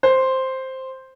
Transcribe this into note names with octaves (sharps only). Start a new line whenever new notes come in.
C5